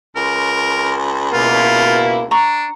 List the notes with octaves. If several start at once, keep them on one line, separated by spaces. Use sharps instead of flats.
C#2 A#4
B2 A#3 E4 F4
D4 A#5 C#6